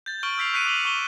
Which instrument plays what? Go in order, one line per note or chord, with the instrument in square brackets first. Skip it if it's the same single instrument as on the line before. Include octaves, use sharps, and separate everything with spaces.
[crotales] G6 A6
C#6 F6 D7 F#7 G7
E6 G6 B6 C7 F7
C#6 F#6 B6 C#7 D#7 F7
D6 D#7 F#7 G7
C#6 D#7 E7 G7